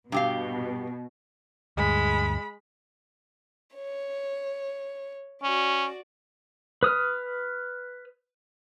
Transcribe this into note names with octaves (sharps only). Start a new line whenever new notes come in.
G2 B2 G4 F5
D2 G2 G#3 B5
C#5
C#4 F#4 D5
B4 D#6 F6